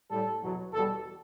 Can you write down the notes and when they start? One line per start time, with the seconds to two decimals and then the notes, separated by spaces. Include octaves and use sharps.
0.10 A2 G3 A4
0.41 E2 B2 F#3
0.73 E2 B2 G3 A4